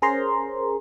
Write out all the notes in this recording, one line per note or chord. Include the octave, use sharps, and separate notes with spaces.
C#4 G#4 A#4 C5 A#5 C6